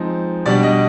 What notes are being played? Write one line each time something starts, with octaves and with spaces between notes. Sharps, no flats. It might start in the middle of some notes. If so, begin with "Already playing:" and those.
Already playing: F3 G#3 C4 D#4
B2 G3 D4 D5
D#5